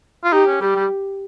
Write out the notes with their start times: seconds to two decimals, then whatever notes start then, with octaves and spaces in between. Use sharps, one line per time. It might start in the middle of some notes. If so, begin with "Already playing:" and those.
0.24 F4
0.32 D#4 G4
0.47 C#4
0.61 G3 G4
0.76 G3